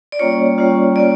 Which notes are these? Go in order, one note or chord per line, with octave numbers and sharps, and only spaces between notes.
D5
G3 A#3 C#4 F4 C#5
G3 A#3 C#4 F4
G3 A#3 C#4 F4 D5